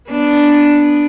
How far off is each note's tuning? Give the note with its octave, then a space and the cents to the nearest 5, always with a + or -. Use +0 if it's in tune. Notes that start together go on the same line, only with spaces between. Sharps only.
B3 +0 D4 +0